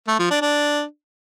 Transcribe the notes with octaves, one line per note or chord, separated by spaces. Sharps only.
A3
F3
D4
D4